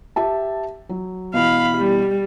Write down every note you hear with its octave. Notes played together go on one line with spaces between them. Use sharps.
G4 E5 A5
F#3
B2 E3 F5 B5
G3